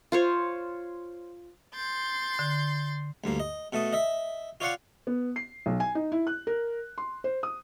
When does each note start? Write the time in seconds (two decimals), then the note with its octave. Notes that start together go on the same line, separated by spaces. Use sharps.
0.12 F4 C5 C#5
1.74 C6 G6 A6
2.39 D3
3.24 D2 G2 A#3
3.40 D#5
3.73 B2 A3 A5 D#6
3.93 D#5 E5
4.60 F4 C#5 D5 F5 F#5 C#6
5.07 B3
5.36 C7
5.66 B1
5.80 G#5
5.95 D#4
6.12 E4
6.27 F#6
6.47 A#4
6.98 C6
7.24 C5
7.43 D#6